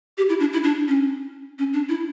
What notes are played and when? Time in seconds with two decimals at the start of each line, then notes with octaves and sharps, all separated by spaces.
0.18 G4
0.29 E4
0.40 D4
0.53 E4
0.63 D4
0.88 C#4
1.59 C#4
1.73 D4
1.89 E4